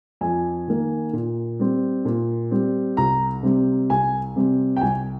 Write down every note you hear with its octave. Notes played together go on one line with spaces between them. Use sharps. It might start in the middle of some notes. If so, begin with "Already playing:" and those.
F2 G#5
D#3 A#3
A#2
G3 C4
A#2
G3 C4
C2 A#5
C3 G3 C4
C2 G#5
C3 G3 C4
G5
C2 G#5